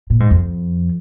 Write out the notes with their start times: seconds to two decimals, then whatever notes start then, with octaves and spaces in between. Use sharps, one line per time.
0.10 A#2
0.20 G#2
0.31 F2